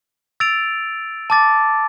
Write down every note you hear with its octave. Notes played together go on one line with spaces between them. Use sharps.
E6 A6 D7 F7
A5 D6 A6